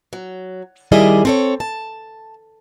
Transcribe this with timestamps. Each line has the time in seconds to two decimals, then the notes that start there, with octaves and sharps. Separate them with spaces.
0.13 F#3
0.92 D#3 G3 E4 G#4 D5 D#5
1.25 C4 A4 C#5
1.60 A5